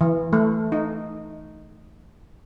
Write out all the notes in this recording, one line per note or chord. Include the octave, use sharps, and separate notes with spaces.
E3
A3
D#4